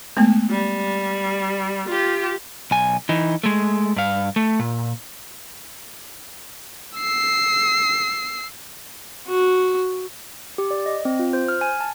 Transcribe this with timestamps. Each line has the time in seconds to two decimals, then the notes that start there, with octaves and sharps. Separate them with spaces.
0.17 G#3 A3 B3
0.50 G3
1.89 F4 G4
2.71 B1 G#5
3.09 E3 D#4
3.44 G#3 A3
3.96 G2 F5
4.36 A3
4.59 A#2
6.98 E6 C7
9.28 F#4
10.58 G4
10.71 D5
10.86 D#5
11.05 C4
11.19 F4
11.33 C5
11.48 F6
11.61 G#5
11.81 A5